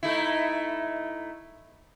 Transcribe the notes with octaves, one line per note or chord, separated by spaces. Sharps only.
A3 D#4 E4